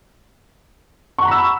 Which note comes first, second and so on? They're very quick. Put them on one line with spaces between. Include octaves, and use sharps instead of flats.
C#6 F#5 A#5 B5 E6